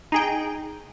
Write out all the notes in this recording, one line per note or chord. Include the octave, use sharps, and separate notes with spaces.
D#4 G#4 G5